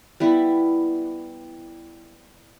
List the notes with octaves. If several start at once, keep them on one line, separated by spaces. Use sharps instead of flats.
G3 B3 E4